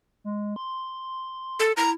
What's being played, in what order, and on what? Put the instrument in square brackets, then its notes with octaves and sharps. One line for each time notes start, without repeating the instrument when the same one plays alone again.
[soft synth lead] G#3
C6
[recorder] A4
[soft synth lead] E4 [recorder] A#5